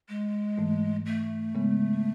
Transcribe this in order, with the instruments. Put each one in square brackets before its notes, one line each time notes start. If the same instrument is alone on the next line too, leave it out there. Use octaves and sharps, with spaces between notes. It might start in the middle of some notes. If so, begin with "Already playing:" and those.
[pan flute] G#3
[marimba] G#2 E3 A3
[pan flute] A3
[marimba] C#3 G#3 B3